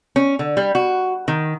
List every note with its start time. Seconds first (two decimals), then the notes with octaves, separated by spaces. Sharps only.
0.16 C#4
0.39 D3
0.57 G3
0.75 F#4
1.28 D#3